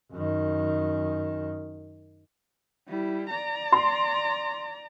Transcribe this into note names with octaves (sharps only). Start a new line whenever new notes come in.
F#2 D#3
G3 E4
D5 A#5
C6